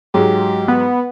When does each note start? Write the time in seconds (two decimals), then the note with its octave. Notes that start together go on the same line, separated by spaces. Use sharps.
0.14 G#2 F#3 G#3 G4
0.68 B3